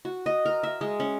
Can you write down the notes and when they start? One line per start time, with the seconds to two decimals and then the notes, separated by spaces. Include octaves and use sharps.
0.05 F#4
0.26 D#5
0.46 A#4
0.63 E5
0.81 G#3
1.00 C#4